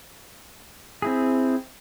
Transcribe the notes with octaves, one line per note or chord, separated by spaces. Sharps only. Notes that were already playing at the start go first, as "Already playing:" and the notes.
C4 E4 G#4